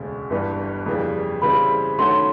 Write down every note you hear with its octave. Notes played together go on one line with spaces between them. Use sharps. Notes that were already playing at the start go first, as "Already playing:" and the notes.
Already playing: E1 D2 C#3
G1 G2 E3 G3 B3
F2 C#3 E3 G3
C#3 E3 G3 C4 E4 B5
D#3 F#3 A3 C#4 F#4 C6